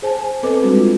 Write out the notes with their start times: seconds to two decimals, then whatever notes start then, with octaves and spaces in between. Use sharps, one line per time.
0.02 G#4 C5 G#5 A5
0.17 G#5
0.43 B3 C4 A4 B4 D#5 D6
0.61 G3 G#3 C4 D4 F#4
0.77 F4